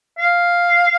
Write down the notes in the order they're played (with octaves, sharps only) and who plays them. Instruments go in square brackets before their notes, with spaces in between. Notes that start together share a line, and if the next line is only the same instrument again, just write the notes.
[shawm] F5